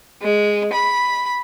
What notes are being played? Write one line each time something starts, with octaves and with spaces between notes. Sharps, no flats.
G#3
B5